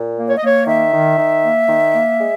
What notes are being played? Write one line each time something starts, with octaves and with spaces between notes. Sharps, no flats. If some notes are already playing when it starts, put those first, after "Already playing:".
Already playing: A#2
A#3
C#5
D#5
A#3 C#5
D#3 E5
D#3
D#3
A#3
D#3
A#3
G#3